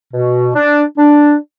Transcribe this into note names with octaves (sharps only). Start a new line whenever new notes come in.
B2
D4
D4